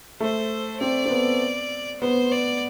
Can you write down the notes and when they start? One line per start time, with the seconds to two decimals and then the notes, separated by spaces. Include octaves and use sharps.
0.20 A3 C5
0.81 C4 D5
1.06 C4
1.10 B3
2.01 B3 C5
2.32 D5